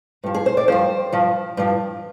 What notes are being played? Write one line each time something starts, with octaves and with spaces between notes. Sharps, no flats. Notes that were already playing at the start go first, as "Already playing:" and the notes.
G2 F3
G#4
C5
D5
G2 F3 C5
G2 F3
G2 F3